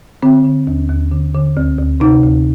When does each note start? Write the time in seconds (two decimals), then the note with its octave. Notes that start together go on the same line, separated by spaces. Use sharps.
0.23 D3 C4
0.44 D3
0.67 D#2
0.89 D#2
1.11 D3
1.34 D3
1.57 D2
1.78 D2
2.00 C3 D#4
2.23 D2